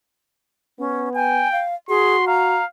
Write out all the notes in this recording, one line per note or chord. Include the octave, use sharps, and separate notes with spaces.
B3 C#4
G5 G#5
F5
F#4 G#4 C6
F5 A#5